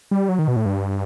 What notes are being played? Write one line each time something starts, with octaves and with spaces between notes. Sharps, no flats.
G3
F#3
D#3
B2
A2
G2